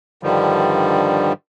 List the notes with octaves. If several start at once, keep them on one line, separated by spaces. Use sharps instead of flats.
G2 D3 D#3 F3 G3